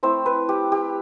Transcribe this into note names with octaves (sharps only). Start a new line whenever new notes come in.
A3 C4 E4 C5
B4
G4
G4